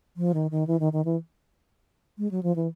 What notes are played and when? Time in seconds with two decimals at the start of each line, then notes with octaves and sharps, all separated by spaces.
0.17 F3
0.34 D#3
0.51 D#3
0.67 E3
0.80 D#3
0.93 D#3
1.05 E3
2.18 G#3
2.31 F#3
2.43 F3
2.56 E3